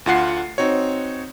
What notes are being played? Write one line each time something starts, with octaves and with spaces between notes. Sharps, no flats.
D2 F4 F#5 C7
C4 D#4 F#4 C#5